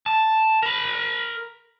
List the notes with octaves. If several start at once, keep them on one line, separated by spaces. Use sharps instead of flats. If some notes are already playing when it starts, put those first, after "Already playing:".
A5
A#4 B5